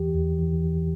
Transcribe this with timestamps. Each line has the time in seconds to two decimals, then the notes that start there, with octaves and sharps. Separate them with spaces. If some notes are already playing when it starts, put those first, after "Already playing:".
Already playing: E2 E3 G4
0.15 E2
0.39 E3